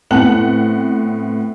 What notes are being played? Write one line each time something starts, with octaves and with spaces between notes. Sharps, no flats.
A2 B3 C4 F#5 F#7